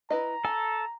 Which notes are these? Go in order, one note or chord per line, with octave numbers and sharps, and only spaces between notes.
E4 B4 D#5 A#5
A4 G#5